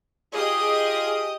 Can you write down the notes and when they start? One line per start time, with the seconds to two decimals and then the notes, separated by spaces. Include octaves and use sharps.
0.33 F4 G4 G#4 D#5 D#6